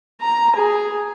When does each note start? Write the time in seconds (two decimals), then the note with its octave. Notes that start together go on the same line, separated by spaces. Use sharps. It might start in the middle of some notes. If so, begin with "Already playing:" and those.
0.21 A#5
0.56 G#4